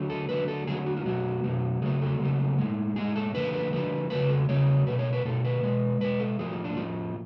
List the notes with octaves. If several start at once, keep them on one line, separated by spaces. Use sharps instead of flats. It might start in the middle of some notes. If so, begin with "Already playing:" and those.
Already playing: D3 F#3 A3
A4
D3 F#3 A3 B4
A4
D3 F#3 A3 G#4
F#4
F4
B2 F#3 A3 F#4
B2 F#3 A3
C#3 F#3 A3 G#4
A4
C#3 F#3 A3
A2 G#3
A2 G#3 G#4
A4
D3 F3 A3 B4
B4
D3 F3 A3 B4
C#3 F#3 A3 B4
A4
C#3 F#3 A3 C#5
B2 A3 B4
C#5
B4
B2 A3 A4
B4
B2 G#3
B2 G#3 B4
A4
A2 F3 A3 G#4
F4
D4
A2 F3 A3 F4